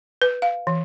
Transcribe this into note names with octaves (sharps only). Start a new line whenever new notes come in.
B4
F5
E3